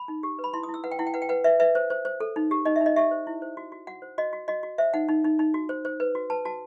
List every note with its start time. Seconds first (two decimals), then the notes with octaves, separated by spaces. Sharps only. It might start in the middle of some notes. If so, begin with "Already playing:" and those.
Already playing: B5
0.08 D#4
0.23 G4
0.39 B4
0.44 B5
0.53 E4 C6
0.63 D#6
0.69 E4
0.74 E6
0.84 B4 F#5
0.91 G5
0.99 E4 F#5
1.07 G5
1.14 B4 F#5
1.22 G5
1.29 B4 F#5
1.44 B4 E5
1.60 B4 E5
1.75 C5
1.90 C5
2.05 C5
2.20 A4
2.36 D#4
2.51 G4
2.65 D#4 D#5
2.76 E5
2.81 D#4 D#5
2.96 G4 E5
3.11 C5
3.27 E4
3.42 C5
3.57 F#4
3.72 F#4
3.87 F#4 F#5
4.02 C5
4.18 F#4 D#5
4.33 F#4
4.48 F#4 D#5
4.63 F#4
4.78 C5 E5
4.94 D#4 F#5
5.08 D#4
5.25 D#4
5.39 D#4
5.54 F#4
5.69 C5
5.85 C5
6.00 B4
6.15 F#4
6.30 B4 A5
6.45 F#4 A5